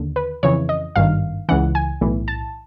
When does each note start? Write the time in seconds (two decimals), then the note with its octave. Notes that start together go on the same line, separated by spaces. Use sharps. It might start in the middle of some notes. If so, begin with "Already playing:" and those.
Already playing: D#2 D3
0.16 B4
0.43 F2 C#3 E3 C#5
0.69 D#5
0.96 G#1 G2 D#3 F5
1.49 C#2 C#3 E3 F#5
1.75 G#5
2.01 B1 A2 E3
2.28 A5